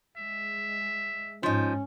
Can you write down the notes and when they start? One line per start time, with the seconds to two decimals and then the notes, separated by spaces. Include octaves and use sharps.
0.17 G#3 E5
1.43 G#2 F3 C#4 D#4